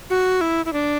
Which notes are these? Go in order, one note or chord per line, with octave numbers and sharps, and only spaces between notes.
F#4
E4
E4
D4